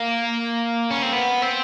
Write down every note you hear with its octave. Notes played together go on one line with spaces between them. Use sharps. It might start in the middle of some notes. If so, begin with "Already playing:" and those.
Already playing: A#3
C#4
C4
B3
C4